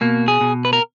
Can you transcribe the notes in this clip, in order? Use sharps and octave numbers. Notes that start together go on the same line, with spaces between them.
B2 A#3
G#4
B2
B4
A#4